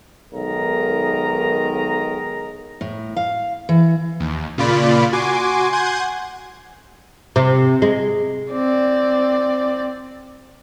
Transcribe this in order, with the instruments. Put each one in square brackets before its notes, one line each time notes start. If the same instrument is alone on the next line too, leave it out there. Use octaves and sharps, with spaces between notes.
[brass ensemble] B1 D#3 G#3 A#4 D#5 A#5
[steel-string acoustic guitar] A2
F5
E3
[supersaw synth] D#2
A#2 C#3 F4 D5 B5
F#4 G#5 C6 D6
F#5 G#5 C6 G6 G#6
[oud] C3
G#3
[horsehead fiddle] C4 D5